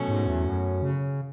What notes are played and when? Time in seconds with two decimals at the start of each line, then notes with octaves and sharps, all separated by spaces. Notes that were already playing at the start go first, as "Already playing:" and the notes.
Already playing: B2 F#3 A3 C#4
0.08 G#2
0.26 E2
0.45 F#2
0.82 C#3